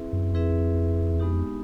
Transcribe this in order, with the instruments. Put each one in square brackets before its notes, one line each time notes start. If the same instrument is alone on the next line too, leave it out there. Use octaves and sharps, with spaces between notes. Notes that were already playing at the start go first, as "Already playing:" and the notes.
Already playing: [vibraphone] C4 E4 G#4 B4 E5
[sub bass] F#2
[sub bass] F2 [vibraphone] C4 E4 G#4 B4 E5
[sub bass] E2
[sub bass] F2 [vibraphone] G#3 B3 D#4 G4